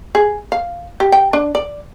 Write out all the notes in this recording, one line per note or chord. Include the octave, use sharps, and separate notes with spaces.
G#4
F5
G4
G5
D4
D5